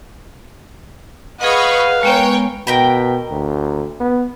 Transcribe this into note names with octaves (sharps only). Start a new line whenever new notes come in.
G#4 B4 D#5 F5 F#5 B5 C#6
G#3 B3 A#4 C#5 G5
B2 A#4 G5 B5
D2
B3